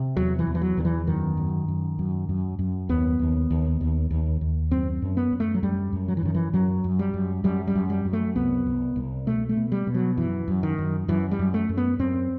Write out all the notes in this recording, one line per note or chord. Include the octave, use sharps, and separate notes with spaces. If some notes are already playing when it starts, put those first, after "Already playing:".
Already playing: C3
E2 F#3
E3
E2
E3
F#3
E2 D#3
E3
F#2 D#3
F#2
F#2
F#2
F#2
F#2
D#2 B3
D#2
D#2
D#2
D#2
D#2
F#2 C4
F#2
B3
F#2
A3
F#3
F#2 G3
F#2
F#3
E3
F#2 D#3
E3
F#2 F#3
F#2
G3
F#2
F#2 G3
G3
F#2
G3
F#2
A3
C2 B3
C2
C2
B2 A3
A3
B2
G3
B2
F#3
F#2 E3
F#2
D#3
F#2
F#2 E3
G3
F#2
A3
F#2
B3
F#2 C4